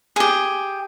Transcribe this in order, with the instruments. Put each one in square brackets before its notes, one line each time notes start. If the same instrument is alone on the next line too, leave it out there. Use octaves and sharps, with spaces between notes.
[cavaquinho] G4 G#4